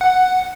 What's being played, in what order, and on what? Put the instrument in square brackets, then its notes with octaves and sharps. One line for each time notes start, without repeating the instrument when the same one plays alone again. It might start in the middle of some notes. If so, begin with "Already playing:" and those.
[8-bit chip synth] F#5